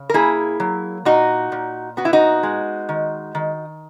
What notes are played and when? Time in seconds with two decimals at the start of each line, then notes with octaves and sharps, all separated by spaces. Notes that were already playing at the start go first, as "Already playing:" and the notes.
Already playing: C#3
0.10 A#4
0.14 A#3 E4 G#4
0.60 F#3
1.05 A#2 D#4 F#4
1.52 A#2
1.97 B3 F#4
2.05 E4
2.13 D#4 F#4
2.43 G#3
2.89 D#3
3.35 D#3